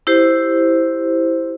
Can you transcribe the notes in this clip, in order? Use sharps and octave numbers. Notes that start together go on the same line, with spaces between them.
E4 G4 C5